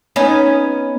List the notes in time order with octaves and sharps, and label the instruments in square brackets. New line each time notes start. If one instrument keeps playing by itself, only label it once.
[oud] B3 C#4 D#4